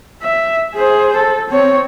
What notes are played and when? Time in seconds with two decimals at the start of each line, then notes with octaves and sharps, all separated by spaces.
0.23 E5
0.75 G#4 C5
1.17 A4
1.50 C4 C#5